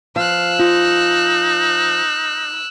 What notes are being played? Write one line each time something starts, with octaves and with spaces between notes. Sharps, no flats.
F3 F5 E6 F#6
D#4 F4